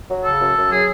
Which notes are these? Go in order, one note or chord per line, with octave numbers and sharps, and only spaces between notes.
F#3
C#3 A4
F#2
F#2
F#3 G#4